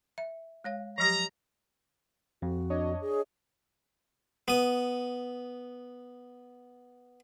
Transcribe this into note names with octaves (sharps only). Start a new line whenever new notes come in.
E5
G#3 C#5 F5
F3 F#3 G4 A#5
F2 F#4
D4 C#5 D#5
G#4
B3 D#6